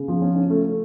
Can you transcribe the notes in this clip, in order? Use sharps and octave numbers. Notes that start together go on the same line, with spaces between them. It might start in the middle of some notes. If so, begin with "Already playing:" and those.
Already playing: C#3
F3
C#4
C#4
A3
A3